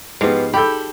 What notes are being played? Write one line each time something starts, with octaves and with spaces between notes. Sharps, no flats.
G#2 F3 B3 G4 F5
G4 A4 B5 G6